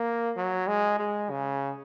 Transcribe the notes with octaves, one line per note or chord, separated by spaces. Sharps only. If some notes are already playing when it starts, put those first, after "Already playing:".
Already playing: A#3
F#3
G#3
G#3
C#3